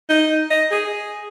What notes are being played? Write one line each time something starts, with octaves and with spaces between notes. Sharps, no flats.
D#4
D#5
G#4